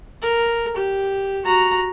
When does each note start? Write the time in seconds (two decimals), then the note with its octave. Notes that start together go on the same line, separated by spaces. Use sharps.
0.22 A#4
0.76 G4
1.45 F#4 A#5